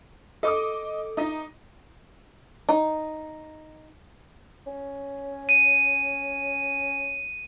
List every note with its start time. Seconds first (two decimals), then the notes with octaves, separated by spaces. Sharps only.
0.43 A4 D#5 D6 D#6
1.17 D#4 A#6
2.69 D#4
4.67 C#4
5.49 D#7